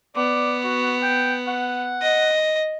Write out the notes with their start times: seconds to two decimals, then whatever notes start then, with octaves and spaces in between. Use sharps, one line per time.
0.16 B3 D5
0.64 F#4
1.03 G5
1.47 F#5
2.02 D#5